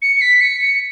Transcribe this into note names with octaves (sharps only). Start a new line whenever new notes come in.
C#7
C#7
B6
C#7
C#7